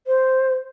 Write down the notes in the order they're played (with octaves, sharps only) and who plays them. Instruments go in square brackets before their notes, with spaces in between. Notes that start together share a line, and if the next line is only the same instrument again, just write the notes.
[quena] C5